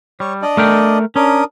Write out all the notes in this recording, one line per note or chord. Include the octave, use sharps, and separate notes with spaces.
G3 C#5
D4 D5 D#5
A3 A#4 G5
C#4 D4 A#4 D#6